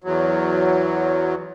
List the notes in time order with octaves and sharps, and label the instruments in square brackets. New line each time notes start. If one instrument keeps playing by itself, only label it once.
[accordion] E2 F#3